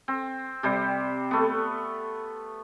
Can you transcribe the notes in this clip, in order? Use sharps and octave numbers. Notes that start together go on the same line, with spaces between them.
C4
C3 G3 C5
A3 B3